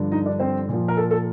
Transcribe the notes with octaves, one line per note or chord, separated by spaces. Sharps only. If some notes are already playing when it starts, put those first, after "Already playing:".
Already playing: G2 D3 F3
D#4 D#5
D4 D5
C4 C5
A#2 F3
A#4
A4
A4